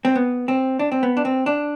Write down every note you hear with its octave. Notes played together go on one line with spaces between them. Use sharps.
C4
B3
C4
D4
C4
B3
D4
C4
D4